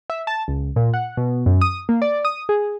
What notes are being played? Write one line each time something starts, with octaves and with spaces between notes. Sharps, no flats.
E5
A5
C#2
A#2
F#5
B2
F#2
D#6
A#3
D5
D#6
G#4